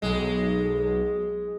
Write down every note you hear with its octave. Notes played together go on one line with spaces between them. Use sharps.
B1 G#3